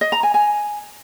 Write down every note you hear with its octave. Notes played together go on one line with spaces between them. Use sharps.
D#5
A#5
G#5
G#5